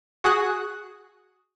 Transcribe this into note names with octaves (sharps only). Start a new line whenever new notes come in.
F#4 G#4 D#6 F#6